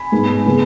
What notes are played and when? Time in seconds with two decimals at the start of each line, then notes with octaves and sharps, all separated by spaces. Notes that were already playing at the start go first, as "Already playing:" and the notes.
Already playing: G#5 B5
0.12 G#2 G#3 B3
0.46 C#3 G#3 B3